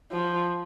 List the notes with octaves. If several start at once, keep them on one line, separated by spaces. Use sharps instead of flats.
F3